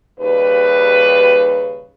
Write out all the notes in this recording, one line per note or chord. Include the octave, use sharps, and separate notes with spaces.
D#2 C#3 G3 B4